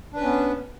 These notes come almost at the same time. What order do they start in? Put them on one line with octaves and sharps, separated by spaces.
D4 B4 C#4 B3